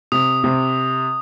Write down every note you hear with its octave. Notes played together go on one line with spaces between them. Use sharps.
C3 D#6
C3